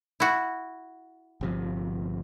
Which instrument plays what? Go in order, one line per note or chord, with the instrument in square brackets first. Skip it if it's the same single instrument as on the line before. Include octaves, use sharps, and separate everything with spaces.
[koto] E4 F#4
[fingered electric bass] G1 C3 F3